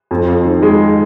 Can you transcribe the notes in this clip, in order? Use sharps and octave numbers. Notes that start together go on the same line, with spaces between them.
F2
F2
D#3
G#3